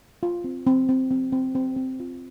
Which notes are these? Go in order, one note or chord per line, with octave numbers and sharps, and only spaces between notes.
F4
C4
C4
C4
C4
C4
C4
C4
F4